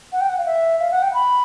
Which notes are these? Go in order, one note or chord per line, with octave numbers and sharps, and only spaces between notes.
F#5
G5
F#5
F5
E5
F5
F#5
G5
B5